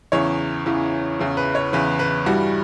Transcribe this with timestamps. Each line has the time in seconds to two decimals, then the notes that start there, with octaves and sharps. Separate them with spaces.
0.12 E2 C#3 E3 C#5
0.66 E2 C#3 E3
1.19 E2 C#3 E3
1.37 B4
1.55 C#5
1.72 E2 C#3 E3 B4
1.99 B4
2.26 G2 E3 G3 F#4